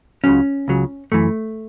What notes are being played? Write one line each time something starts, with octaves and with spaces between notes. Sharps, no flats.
C#2 C#3 F#3 C#4
C#2 C#3 F#3
F#2 E3 A3